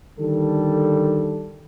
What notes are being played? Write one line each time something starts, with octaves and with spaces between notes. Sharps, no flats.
D3 D#3 G3 A4